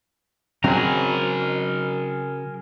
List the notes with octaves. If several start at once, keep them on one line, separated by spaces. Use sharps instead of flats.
C#3 F#3 C4 G#4 A#4